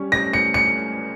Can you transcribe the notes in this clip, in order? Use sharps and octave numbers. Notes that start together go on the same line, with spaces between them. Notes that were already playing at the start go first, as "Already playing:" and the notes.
Already playing: G3 C#4
A#6
C#7
C#7